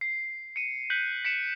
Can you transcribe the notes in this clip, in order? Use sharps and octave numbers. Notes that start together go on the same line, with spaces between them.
C7
C#7 D#7
F#6 G6 B6 C#7 F#7
B6 C#7 D7 E7